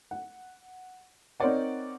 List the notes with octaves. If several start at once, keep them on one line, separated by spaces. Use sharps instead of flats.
F#5
C4 D#4 A#4 C#5 D5 F#5